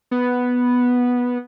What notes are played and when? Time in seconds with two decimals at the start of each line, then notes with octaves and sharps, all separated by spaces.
0.11 B3